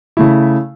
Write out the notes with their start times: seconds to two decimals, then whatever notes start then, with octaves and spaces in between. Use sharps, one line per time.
0.17 C#3 A3 E4